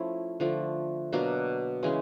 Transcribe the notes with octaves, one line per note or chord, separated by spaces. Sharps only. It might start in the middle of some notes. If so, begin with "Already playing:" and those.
Already playing: F3 A3 C#4 E4
D3 F3 A3
B2 F#3 A#3 D4
C#3 E3 G#3 C#4